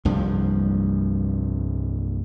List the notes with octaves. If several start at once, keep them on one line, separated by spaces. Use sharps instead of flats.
C2 G2 F3